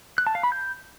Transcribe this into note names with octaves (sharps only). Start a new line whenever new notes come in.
F#6
A5
F5
B5
G6